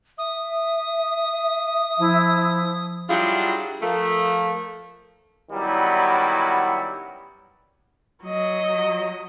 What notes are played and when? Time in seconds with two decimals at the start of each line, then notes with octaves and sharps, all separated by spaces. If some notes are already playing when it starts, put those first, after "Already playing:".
0.18 E5 D#6
2.00 F3 E4
3.09 F#3 G3 D4 E4 F4 G#4
3.82 F3 A3 A#4
5.50 D#3 F#3 G3 B3 C#4 E4
8.23 F#3 D#5